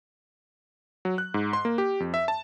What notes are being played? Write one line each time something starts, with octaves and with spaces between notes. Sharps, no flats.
F#3
F#6
G#2
C6
A#3
G4
F2
E5
A5